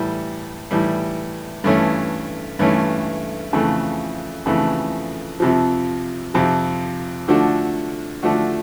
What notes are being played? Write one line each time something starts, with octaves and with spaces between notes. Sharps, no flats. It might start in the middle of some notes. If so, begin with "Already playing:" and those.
Already playing: A2 E3 G3
A2 E3 G3
G2 E3 A3 C#4
G2 E3 A3 C#4
F2 C#3 E3 A3
F2 C#3 E3 A3
F2 C3 F3
F2 C3 F3
D3 F3 A3 D4 F#4
D3 F3 A3 D4 F#4